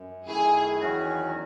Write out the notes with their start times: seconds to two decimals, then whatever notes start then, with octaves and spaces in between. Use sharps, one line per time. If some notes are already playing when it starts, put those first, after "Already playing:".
Already playing: F#2
0.27 F#2 D#3 A3 E4 G#4
0.80 E2 D#3 F#3 C#4 F#4